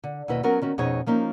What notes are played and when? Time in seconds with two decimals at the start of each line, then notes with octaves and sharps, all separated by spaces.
0.04 D3
0.28 D#2 B2 E4 B4 D#5
0.43 F#3 B3 C#4 F#4 A#4
0.62 D#3 C#4 F#4
0.78 F2 B2 C#4 D#4 G#4 C#5
1.06 F3 A#3 C#4 D#4